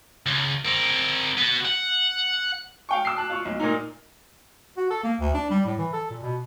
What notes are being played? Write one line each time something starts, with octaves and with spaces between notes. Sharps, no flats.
C#2
C4 A#4
B3 F#4
F#5
F5 G5 C#6
D6 E6 C7
A5 F#6
F4 C#6
B1
A#2 A#3 D#4
F#4
A4
A#3
D2
D4
G3
A2
E3
A4
A#2
B2